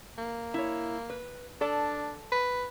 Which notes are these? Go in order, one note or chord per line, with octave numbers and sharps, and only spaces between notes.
A#3
E4 C#5
B4
D4 A4 D5 A5
B4